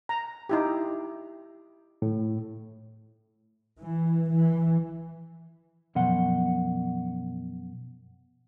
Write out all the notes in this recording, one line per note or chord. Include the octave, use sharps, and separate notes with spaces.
A#5
D#4 E4 G4
A2
E3
E3
F#2 B2 F3 F#5 C6